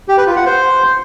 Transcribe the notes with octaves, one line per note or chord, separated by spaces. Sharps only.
G4
B4
F4
F#5
C5